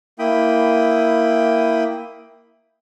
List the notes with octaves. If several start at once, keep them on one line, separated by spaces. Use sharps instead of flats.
A#3 E4 G5 B5 D#6